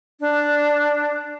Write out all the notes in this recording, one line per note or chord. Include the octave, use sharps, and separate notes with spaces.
D4